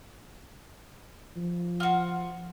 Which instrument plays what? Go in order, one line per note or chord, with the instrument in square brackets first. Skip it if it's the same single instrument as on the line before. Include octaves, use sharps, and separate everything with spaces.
[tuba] F3
[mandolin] F4 F#4